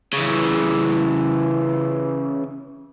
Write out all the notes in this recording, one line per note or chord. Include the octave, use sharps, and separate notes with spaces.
C#3 E3